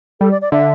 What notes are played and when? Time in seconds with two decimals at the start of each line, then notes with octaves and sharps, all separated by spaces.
0.21 G3 A4
0.31 D5
0.42 D5
0.52 D3 E5